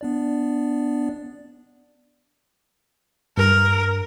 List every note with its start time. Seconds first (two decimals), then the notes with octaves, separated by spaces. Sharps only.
0.01 B3 D4 D5
3.37 G2 A#4